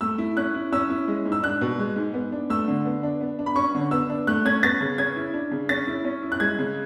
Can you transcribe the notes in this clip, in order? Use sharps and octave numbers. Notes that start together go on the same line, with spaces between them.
A3 E6
E4
C#4 F#6
E4
C#4 E6
E4
G#3
G#2
E6
D4 F#6
B2
G#3
G#2
B3
D4
A3 E6
D3
B3
D4
B3
D4
B5
C#4 C#6
D3
B3 E6
D4
A3 F#6
C#4 G#6
B3 A6
C#3
C#4 G#6
E4
D4
C#3
C#4 A6
E4
C#4
E4
F#6
G#3 G#6
C#3